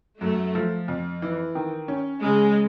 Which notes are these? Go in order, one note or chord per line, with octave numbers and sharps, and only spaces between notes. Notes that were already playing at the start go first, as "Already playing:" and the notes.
F#2 A3
F3
F2
E3
D#3
C#4
C#3 G#3